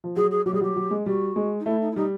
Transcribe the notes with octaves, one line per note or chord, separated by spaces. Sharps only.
F3
F#3 G#4
G#4
F#3 G4
G3 G#4
F#3 G4
F#3
G#3
G3 F#4
G#3
D#4
A3 E4
D#4
E4
G3 D#4